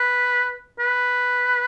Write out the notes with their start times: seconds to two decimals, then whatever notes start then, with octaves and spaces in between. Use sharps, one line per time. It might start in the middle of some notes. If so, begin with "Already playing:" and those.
Already playing: B4
0.79 B4